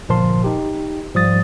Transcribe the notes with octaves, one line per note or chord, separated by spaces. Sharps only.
G1 A#2 F3 A#4 A5 C6
D#4 G4
G#2 F3 G3 D#6 A6